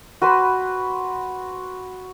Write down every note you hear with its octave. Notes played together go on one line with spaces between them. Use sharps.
F#4 B4 B5 C6